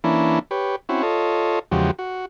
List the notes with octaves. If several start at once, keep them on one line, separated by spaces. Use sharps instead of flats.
E3 A#3 C#4 D4 E4
G4 B4 C#5
C4 C#4 E4 F#4
F4 A4 C#5 D#5
E2 C#3 F3 G#3 F#4 G4
F#4